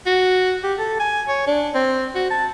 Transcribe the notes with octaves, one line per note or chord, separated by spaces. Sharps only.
F#4
G4
A4
G#5
C#5
D4
C4
F#4
A5